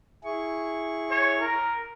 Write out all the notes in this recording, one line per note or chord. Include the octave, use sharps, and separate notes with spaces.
E4 G#4 C#6
C#5
A#4